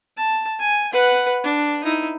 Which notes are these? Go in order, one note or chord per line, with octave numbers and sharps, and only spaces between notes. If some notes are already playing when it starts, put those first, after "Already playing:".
A5
G#5
B4 F#5
D4
D#4 E4